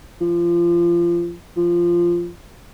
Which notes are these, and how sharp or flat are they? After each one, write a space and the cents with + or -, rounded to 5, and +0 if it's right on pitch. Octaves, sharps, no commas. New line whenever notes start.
F3 -25
F3 -10